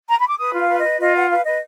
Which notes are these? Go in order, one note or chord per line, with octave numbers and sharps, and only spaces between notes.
A#5
B5
D6
B4 D#6
F4
F5
B4
D#5
B4
F4 D#5
B4 F#5
B4 F5
B4 D#5